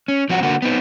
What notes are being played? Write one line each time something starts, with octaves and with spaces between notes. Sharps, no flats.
C#4
F3 C4 F#4
D3 A#3 F#4
B3 C4 D#4